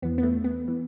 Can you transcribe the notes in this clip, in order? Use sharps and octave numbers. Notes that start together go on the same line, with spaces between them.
E2 E3 B3
B3
A3
B3
E3